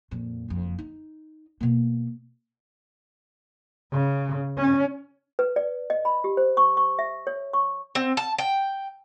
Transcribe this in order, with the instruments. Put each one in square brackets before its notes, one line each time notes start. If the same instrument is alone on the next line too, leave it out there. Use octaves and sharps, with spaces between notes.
[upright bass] F2 A#2
F#1 F2
D#4
B2 A#3
[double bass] C#3
C#4
[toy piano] B4
D5
D#5
B5
G4
C5
C#6
C#6
E5
C#5
C#6
[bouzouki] C4
A5
G5